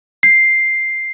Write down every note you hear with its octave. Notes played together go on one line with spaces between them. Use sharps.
C7